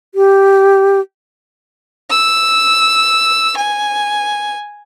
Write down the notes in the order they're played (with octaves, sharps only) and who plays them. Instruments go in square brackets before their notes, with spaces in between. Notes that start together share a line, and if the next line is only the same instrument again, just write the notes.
[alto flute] G4
[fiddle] E6
G#5